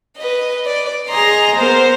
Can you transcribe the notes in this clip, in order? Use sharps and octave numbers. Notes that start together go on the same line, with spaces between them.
B4 D#5
D5
G#4 D#5 A#5 C6
B3 A#4 C5